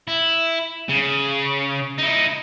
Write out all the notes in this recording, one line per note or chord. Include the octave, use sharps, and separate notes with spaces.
E4
C#3
D#4 E4